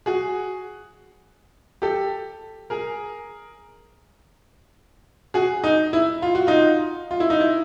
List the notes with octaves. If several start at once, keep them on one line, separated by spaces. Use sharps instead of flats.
F#4 G#4
G4 A4
G#4 A#4
F#4 G#4
D#4
E4
F4
F#4
D#4 F4
F4
E4
D#4
E4